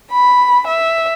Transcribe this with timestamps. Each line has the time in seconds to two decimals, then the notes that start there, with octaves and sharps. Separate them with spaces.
0.13 B5
0.68 E5